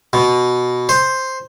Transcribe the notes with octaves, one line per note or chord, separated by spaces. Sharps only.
B2
C5